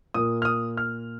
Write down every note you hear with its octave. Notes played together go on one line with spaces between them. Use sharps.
A#2 A#3 D#6
F6
D#6
F6